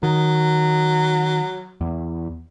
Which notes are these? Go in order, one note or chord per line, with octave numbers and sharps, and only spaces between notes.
D#3 F#3
E2